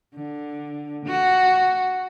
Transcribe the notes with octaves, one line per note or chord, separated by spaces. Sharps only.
D3
F#4